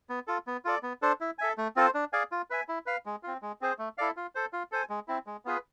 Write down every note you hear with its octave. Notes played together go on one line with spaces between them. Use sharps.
B3
F4 A4
B3
F4 A4 D5
B3
D4 A4 C5
E4
A4 E5 G#5
A3
C4 F4 A4 C5
D4
G#4 D5 F5 G#5
F4
B4 E5 G#5
E4
B4 F5
G#3
C4 F4
G#3
C4 G#4 C5
A3
E4 A4 D5 F5
F4
A4 C5
F4
A4 C5 G#5
G#3
C4 E4
G#3
B3 F4 G#4 B4